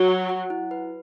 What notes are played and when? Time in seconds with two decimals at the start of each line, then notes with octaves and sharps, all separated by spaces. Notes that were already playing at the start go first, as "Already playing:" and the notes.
Already playing: F#3 F#4
0.08 F#5
0.29 F#5
0.50 E4
0.71 B4